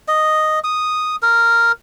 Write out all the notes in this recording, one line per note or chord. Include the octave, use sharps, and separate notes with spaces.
D#5
D#6
A#4